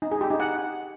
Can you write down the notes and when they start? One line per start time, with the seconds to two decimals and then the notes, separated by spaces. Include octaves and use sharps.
0.02 D#4
0.11 G#4
0.21 G4
0.30 D#4
0.40 F#5